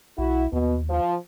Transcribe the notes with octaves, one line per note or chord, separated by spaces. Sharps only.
B1 E4 F#4
D#2 B2
F3